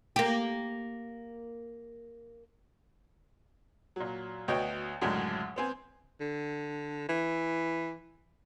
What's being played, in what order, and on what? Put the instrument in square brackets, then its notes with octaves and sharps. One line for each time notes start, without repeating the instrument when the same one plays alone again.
[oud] A#3 G4
[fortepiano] A#2 F#3
D2 B3 F#4 C#5 D#5 G5
C#2 F#2 A2 D3 F#3 G#3
B3 C4 G#5
[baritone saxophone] D3
E3